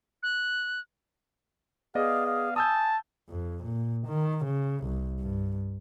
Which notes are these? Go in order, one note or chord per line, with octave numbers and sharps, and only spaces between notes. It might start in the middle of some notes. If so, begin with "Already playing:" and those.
F#6
B3 G#4 D5 D#5 F5
F5
G#5 A5 D#6 E6 G6
F2
A#2
D#3
C#3
C2
G2